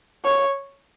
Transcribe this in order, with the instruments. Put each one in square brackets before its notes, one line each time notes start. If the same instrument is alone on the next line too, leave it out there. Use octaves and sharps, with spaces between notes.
[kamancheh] C#5